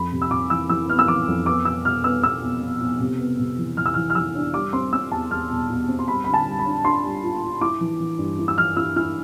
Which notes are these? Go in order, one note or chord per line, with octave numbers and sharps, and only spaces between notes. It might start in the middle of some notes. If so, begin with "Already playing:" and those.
Already playing: F2 B5
C3
E6
C3 D6
E3 E6
E3 E6
B3 F6
E6
E3 D6
F2
B3 D6
B2 E6
B2 F6
B3 E6
B3 E6
B2
B2
B2
C3
B3
C3
E3
E3 F6
E6
E3 F6
F6
E3 E6
D4
G3 D6
C4 C6
C4 E6
E2 A5
E2 F6
B2
B2
C4
C6
G3 B5
D3 B5
A5
G3
B5
D4
D4 C6
G3
F4
F4
E4 D6
E3
E3
G2
E4
E6
E3 F6
E4 E6
E4 F6